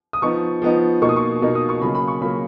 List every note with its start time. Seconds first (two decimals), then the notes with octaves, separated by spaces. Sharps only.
0.13 D#6
0.22 F3 B3 D#4 C#6
0.62 F3 B3 D#4
1.02 B2 A#3 D#4 C#6
1.09 D#6
1.16 C#6
1.42 B2 A#3 D#4
1.55 D#6
1.69 C#6
1.81 C#3 F#3 A#3 B5
1.95 B5
2.08 C#6
2.21 C#3 F#3 A#3 B5